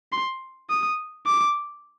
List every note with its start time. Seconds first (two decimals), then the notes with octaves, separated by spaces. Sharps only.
0.12 C6
0.69 D#6
1.26 D6